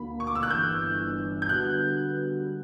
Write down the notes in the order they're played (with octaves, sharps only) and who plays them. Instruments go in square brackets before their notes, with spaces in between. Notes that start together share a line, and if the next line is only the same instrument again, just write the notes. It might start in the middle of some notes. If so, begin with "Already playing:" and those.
Already playing: [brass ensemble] D2 D3 A#3 [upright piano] B5
[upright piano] C#6
D6
E6
F#6
[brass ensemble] G1 G2 E3 [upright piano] G6
[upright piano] G6
[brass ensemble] D3 G3 B3 F#4 [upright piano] F#6